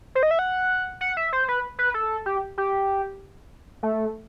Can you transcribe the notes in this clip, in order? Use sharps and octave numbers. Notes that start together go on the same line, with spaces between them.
C5
D#5
E5
F#5
F#5
E5
C5
B4
B4
A4
G4
G4
A3